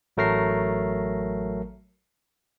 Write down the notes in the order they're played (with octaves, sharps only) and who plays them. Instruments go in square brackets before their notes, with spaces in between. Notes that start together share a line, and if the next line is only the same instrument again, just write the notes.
[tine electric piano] A1 F#3 A3 A#4 A#6 C7